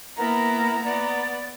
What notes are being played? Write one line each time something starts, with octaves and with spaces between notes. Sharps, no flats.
A#3 B3 E4 A#4 A#5
B3 D5